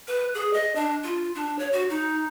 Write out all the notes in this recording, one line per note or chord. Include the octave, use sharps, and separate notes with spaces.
B4
G#4
D#5
D4
F4
D4
C#5
F#4
D#4